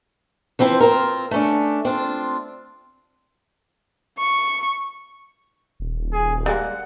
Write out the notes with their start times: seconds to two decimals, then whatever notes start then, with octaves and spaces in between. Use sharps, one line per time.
0.59 E3 F3 C4 E4 G4 C5
0.80 C4 F4 A#4
1.31 A3 C#4 D4
1.85 C4 D4 F4
4.19 C#6
5.80 D#1
6.12 G#4
6.46 G3 G#3 A#3 F#5